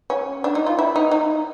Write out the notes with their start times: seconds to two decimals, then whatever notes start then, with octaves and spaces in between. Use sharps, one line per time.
0.10 C#4
0.44 D4
0.55 D#4
0.66 F4
0.79 E4
0.96 D#4
1.11 D#4